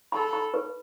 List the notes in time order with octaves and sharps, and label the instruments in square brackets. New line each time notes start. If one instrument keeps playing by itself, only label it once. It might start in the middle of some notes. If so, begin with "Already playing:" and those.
[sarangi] A4 [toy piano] B5
[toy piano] B5
B4